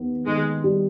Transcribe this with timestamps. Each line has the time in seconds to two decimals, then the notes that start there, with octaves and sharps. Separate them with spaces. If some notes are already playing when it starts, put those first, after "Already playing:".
Already playing: D#2 B3
0.26 D#3 G#3
0.64 G3